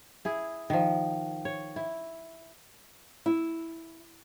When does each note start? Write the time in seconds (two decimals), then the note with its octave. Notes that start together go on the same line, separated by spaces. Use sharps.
0.25 E4 G#4
0.70 D#3 F3
1.45 C#5
1.76 E4
3.26 E4